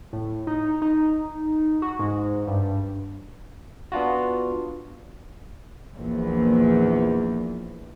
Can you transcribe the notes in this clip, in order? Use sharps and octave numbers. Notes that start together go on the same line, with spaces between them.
A2
D#4
D#4
F#4
G#2
G2
B3 D4 F4 F#4
A#1 E2